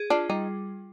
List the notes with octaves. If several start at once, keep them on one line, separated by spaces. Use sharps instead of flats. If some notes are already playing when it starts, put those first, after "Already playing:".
Already playing: G#4
D4 F4
G3 D#4